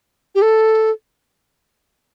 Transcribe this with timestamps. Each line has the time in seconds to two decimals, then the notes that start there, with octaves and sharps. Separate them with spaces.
0.35 G4
0.42 A4